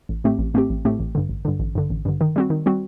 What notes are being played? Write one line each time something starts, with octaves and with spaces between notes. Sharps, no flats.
A1
A2 A3 C4 G4
A1
A2 A3 C4 G4
A1
A2 A3 C4 G4
A1
G2 D3
A1
G2 D3
A1
G2 D3
A1
G2 D3
D#3
G3 C4 F#4
D#3
G3 C4 F#4